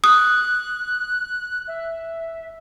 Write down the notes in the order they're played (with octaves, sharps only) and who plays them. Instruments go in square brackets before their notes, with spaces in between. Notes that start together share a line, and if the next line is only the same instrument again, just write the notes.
[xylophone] D#6 [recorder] F#6
[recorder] E5